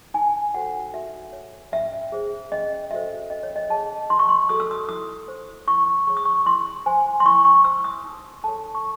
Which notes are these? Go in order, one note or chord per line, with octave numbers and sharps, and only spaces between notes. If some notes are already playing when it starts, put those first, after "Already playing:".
D#4 G#5
F#4 A4 C5 F#5
F#4 E5
C#5
C#4 E5
G#4 C5
C#4 D#5
F#4 A4 C5 E5
C#4 D#5
C#5
D#5
G#4 C#5 A5
D#4 C6
C#6
C6
F#4 A4 D#6
E6
D#6
E4 D#6
C5
E4 C#6
G#4 C#5 C#6
D#6
C#6
E4 C6
C5 G#5
C6
E4 C#6
C#6
C5 E6
D#6
D#4
A4 C#5 A5
C#6